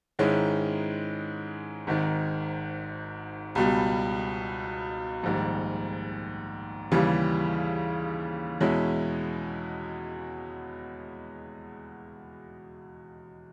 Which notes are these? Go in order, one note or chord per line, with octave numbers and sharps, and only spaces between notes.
G#2 D#3 G#3 C#4 E4
G#1 G#2 D#3
C#2 B2 G3
A#1 G#2 D#3 G3
D#2 C#3 E3 G3
E2 B2 G#3 C#4 E4